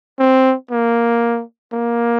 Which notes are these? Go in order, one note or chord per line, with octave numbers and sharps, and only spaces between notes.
C4
A#3
A#3